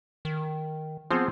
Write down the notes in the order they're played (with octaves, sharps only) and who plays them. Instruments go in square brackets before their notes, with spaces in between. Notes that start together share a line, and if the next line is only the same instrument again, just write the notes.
[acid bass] D#3
[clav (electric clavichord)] F3 C4 G#4 [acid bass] B3